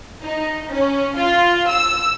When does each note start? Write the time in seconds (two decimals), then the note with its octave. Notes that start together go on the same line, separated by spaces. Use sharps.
0.24 D#4
0.72 C#4
1.17 F4
1.69 E6